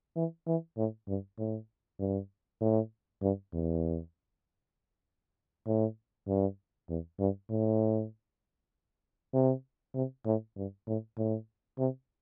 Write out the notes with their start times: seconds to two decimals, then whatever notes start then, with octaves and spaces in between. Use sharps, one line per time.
0.16 E3
0.47 E3
0.77 A2
1.08 G2
1.38 A2
1.99 G2
2.61 A2
3.22 G2
3.53 E2
5.67 A2
6.27 G2
6.89 E2
7.19 G2
7.50 A2
9.33 C3
9.95 C3
10.26 A2
10.56 G2
10.87 A2
11.17 A2
11.79 C3